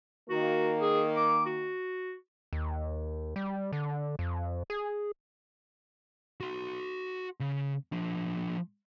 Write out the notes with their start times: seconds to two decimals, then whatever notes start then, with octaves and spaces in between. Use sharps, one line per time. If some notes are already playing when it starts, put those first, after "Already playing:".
0.30 D#3 A#3 F#4
0.81 G#4
1.16 D6
1.46 F#4
2.53 D#2
3.36 G3
3.73 D3
4.19 F2
4.70 G#4
6.40 F#4 C6
7.40 C#3
7.92 F3 D4